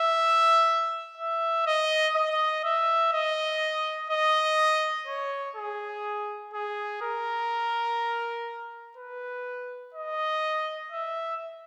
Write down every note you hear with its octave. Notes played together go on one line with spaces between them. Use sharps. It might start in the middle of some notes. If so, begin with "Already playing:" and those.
Already playing: E5
E5
D#5
D#5
E5
D#5
D#5
C#5
G#4
G#4
A#4
B4
D#5
E5